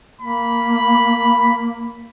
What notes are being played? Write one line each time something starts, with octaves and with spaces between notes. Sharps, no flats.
A#3 B5